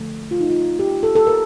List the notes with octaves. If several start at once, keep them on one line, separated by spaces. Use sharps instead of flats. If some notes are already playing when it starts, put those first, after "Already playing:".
Already playing: D3 F3 A3
F4
D#4
F4
G4
A4
A4
A#4